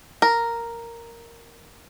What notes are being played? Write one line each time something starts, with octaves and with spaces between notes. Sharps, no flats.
A#4